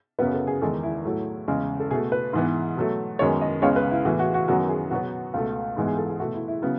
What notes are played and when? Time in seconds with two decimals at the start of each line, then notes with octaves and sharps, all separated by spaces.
0.19 F#2 C#3 F#3 B3 B4
0.33 A4
0.47 G#4
0.61 E2 D#3 G#3 A4
0.83 E4
1.05 A2 F#3 A3
1.48 E2 C#3 G#3
1.80 A4
1.91 B2 G#4
1.94 A3
2.12 B4
2.33 G#2 E3 B3
2.76 B2 F#3 A3
3.19 F#2 D#3 G#3 B3 C#5
3.41 D#5
3.62 C#2 C#3 G#3 B3 C#5
3.76 B4
3.91 E4
4.05 A2 E3 B3 F#4
4.19 F#4
4.34 F#4
4.48 F#2 D#3 F#3 B3 F#4
4.69 G#4
4.90 B2 F#3 B3 F#4
5.34 C#2 B2 A3
5.77 G#2 E3 G#3 B3 E4
5.87 G#4
5.98 A4
6.08 G#4
6.19 B2 A3 F#4
6.34 E4
6.48 E4
6.62 C#3 F#3 B3